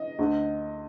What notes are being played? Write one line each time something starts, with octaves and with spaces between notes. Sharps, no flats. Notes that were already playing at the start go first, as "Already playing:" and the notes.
Already playing: D#5
D2 D3